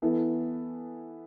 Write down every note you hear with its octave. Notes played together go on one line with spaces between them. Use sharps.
E3 B3 E4 A4